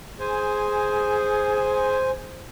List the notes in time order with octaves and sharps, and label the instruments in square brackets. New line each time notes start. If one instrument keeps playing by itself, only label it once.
[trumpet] G#4 [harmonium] C5 G#5